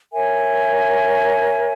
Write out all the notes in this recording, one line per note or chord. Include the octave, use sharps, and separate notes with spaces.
A#4 C#5 E5 G#5